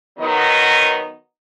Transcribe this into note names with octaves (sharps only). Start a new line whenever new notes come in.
D#3 F#3 B3 D#4 D#5